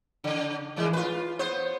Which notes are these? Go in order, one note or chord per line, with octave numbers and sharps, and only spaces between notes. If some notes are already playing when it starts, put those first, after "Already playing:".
C#3
A2 E3 G#3
F4 B4
B3 C5